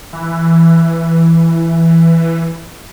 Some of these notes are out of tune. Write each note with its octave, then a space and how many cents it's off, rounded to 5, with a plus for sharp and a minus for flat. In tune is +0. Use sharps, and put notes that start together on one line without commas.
E3 +5